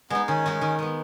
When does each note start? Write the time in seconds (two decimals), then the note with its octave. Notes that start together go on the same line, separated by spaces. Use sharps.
0.10 G#3 B3 D#4
0.27 D#3 C#4
0.46 G#3 D#4 F#4
0.61 D#3
0.79 G#3 B3